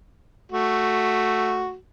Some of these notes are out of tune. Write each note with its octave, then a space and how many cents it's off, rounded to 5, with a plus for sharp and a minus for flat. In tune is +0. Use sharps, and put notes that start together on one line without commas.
A3 +0 F#4 +0